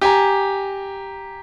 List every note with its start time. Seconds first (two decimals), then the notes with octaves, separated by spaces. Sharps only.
0.01 G4 G#5 A#5